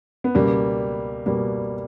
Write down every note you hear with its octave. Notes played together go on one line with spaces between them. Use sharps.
B3
C#2 B2 G3 A#3
B2 G3 A#3